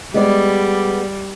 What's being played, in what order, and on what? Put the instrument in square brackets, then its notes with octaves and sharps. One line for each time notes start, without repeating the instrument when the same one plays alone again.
[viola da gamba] G3 [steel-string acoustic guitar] G#3 B3 D5